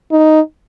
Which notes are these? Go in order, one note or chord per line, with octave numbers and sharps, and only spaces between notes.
D#4